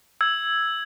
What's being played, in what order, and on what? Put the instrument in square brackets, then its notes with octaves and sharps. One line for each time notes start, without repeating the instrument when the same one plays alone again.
[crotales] E6 G#6